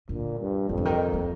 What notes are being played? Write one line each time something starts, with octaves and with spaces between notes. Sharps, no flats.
A#2 D3
G2
F2 D#3
D3
D#3
A#3